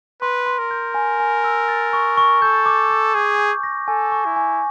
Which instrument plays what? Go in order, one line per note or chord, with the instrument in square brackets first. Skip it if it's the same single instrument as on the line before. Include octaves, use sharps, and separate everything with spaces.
[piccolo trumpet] B4 [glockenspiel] C6
[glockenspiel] C6
[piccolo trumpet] A#4
[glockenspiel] G6
G#5
G#5
E6
A6
C#6
C#6
[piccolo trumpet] A4 [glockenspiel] G6
[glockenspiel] D6
D6
[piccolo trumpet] G#4 [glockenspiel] G6
[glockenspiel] G6
A#6
[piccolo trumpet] A4 [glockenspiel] G#5
[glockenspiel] C#6
[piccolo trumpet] E4
[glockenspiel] G#5